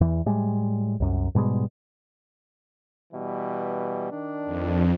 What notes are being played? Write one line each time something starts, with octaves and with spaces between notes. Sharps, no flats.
E2 E3
A2 G3 G#3
C2 F#2
G#2 B2 G3 G#3
B2 E3 G3
D#3 D4
F2